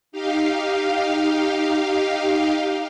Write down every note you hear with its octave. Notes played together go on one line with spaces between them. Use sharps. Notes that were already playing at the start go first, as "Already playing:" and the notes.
D#4 G4 F5